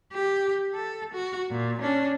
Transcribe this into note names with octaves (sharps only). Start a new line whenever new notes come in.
G4
A4
F#4
A#2
C#4 D4